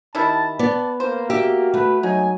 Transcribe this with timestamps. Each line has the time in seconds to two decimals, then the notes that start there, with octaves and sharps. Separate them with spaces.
0.15 D#3 G3 E4 A5
0.59 B3 D5 A5
1.00 A#3 C5
1.30 F#4 G4 E5
1.74 A3 B4
2.03 F#3 D#4 G#5